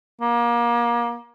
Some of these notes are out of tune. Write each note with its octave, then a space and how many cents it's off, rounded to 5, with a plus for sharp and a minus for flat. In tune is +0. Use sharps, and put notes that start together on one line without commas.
A#3 +30